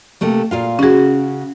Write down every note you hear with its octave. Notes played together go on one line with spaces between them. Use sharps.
C3 A3 A#3
A#2 F4 F5
C#3 C#4 F#4 G#4